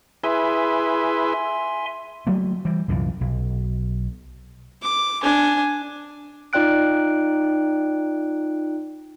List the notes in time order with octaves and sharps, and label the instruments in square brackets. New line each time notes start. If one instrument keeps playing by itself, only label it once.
[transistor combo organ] E4 G#4 B4 [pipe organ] E5 G#5 C6
[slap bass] F#3 A3 A#3
E3 G3
C2 F#2 A#2 E3
B1
[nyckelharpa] D6
D4 G#5
[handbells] D#4 F4 D5 G5 F#6 D7